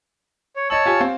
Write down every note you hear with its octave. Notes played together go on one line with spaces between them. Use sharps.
C#5
C#5 D#5 A5 E6 F#7
F4 G4 G#5
C4 F5